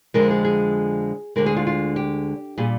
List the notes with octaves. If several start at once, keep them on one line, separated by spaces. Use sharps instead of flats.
F2 D3 F3 G#3 A#4
G#4
G#4
D2 D3 G#3 A#4
G#4
F4
F4
G4
A#2 G3 G#4